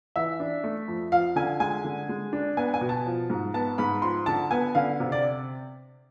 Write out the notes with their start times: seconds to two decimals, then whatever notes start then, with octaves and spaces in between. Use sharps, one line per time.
0.16 E3 E5
0.40 D4
0.64 A3
0.88 F2
1.12 F3 F5
1.36 D3 G#5
1.60 G#3 G#5
1.84 D3
2.09 G#3
2.33 D4
2.57 B3 G#5
2.74 G#5
2.81 B2
2.89 A5
3.06 F3
3.30 G#2
3.54 B3 A5
3.78 G#2 B5
4.02 F3 C6
4.26 D3 A5
4.51 B3 G#5
4.75 D3 F5
5.00 C3
5.12 D5